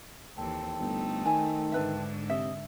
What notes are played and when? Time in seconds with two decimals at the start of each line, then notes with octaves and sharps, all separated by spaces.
0.37 D#2 E3 C4 A4
0.80 G1 A3 D#4
1.26 D#3 G#5
1.72 G#2 D3 D4 B4 E5
2.30 C3 D#5 E5